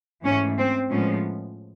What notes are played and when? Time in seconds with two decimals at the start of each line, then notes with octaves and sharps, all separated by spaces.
0.24 G#2 E3 A3 C#4
0.58 C4
0.89 A2 F3 G#3 B3 C#4